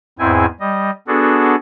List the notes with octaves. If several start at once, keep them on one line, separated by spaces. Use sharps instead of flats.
E2 G#2 C4 E4 G#5
G3 D#5
B3 D4 F#4 G#4 A4